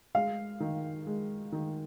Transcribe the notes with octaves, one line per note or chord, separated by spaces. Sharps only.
G#3 F5
D#3
G#3
D#3